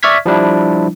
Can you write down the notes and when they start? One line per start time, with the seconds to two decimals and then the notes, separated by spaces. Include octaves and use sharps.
0.03 D5 E5 C#6 F6 G#6 B6
0.26 F3 G3 D4 E4